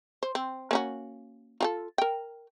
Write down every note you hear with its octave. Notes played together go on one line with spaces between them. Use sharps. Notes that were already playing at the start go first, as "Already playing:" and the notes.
C5
C4
A#3 C#4 F#4
F4 G4 A4
A#4 G5